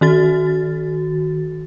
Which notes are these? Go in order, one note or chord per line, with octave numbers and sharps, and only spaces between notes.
D#3 F#4 A6